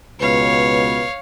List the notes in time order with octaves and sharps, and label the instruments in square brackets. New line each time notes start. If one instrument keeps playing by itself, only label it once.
[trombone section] C#2 B2 B4 [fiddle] C#5 F5